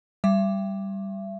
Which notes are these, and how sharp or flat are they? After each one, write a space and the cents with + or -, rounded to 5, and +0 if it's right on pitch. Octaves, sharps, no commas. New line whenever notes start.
G3 +0 E5 +35